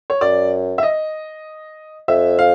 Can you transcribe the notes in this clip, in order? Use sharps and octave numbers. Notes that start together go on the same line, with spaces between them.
C#5
F#2 D5
E5
D#5
F2 E5
F5